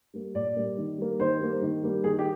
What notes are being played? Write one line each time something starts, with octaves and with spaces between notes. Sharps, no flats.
G3 A#3
A#2 D5
G3 A#3
D#3
G3 A#3
D#3 C5
G3 A#3
D#3
G3 A#3
D#3 G#4
G4